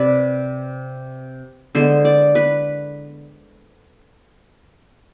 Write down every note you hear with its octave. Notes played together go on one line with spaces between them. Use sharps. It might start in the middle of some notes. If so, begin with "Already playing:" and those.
Already playing: C3 B4 D5
D3 G#3 B3 C5
D5
B4